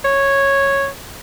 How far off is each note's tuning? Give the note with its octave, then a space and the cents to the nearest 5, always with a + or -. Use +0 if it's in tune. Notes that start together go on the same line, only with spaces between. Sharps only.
C#5 -5